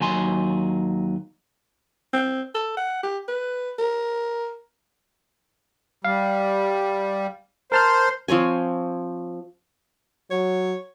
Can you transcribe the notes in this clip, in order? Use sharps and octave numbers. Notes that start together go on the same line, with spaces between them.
D#2 F#3 G#5 C6
C4
A4
F#5
G4
B4
A#4
G3 F5
A#4 C5 A5 F6
F3 C4 C#5 G#5
F#3 C#5